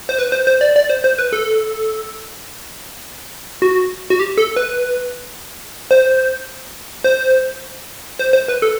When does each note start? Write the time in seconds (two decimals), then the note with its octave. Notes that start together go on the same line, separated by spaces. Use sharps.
0.09 C5
0.19 B4
0.32 C5
0.47 C5
0.61 D5
0.76 D5
0.89 C5
1.04 C5
1.19 B4
1.33 A4
3.62 F#4
4.10 F#4
4.19 G4
4.38 A4
4.56 B4
5.91 C5
7.04 C5
8.19 C5
8.33 C5
8.48 B4
8.62 A4